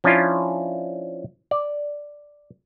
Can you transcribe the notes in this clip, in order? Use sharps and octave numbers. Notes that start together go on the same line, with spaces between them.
F3 C#4 D4 E4 F4
D5